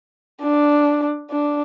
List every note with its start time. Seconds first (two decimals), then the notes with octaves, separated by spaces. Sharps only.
0.43 D4
1.31 D4